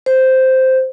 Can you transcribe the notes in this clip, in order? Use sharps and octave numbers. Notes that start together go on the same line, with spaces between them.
C5